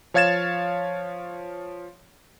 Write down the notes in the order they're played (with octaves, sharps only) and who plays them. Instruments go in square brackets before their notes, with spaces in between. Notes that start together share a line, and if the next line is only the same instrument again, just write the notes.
[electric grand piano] F3 C#5 F5 G#6 A6 E7